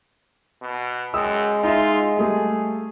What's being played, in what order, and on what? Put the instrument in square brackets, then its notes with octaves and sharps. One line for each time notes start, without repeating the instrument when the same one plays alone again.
[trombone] B2
[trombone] F#2 [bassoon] G#3 [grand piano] G5 D#6 E6
[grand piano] D#4 E5 [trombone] F4
[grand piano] G3 A3 [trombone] G#4